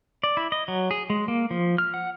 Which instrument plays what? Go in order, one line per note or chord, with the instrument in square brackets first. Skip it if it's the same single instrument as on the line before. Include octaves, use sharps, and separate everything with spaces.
[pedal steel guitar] D5
E4
D#5
F#3
G#4
G#3
A#3
F3
F6
F#5